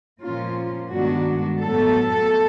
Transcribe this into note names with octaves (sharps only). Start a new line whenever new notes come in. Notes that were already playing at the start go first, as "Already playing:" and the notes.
A#2 F3 A#3 C#4 F4
G2 D#3 G#3 B3 D4 F#4
A2 F#3 B3 A4